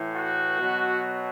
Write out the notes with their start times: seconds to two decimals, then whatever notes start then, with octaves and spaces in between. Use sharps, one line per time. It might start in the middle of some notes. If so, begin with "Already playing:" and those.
Already playing: A2 E3
0.15 F#4
0.60 B2 F#3